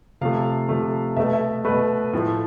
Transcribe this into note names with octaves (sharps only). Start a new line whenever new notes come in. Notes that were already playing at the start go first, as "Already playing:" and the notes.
C3 F3 A3 F5
C3 F3 A3
B2 A3 E5
E5
B2 A3 B4
A2 F3 A3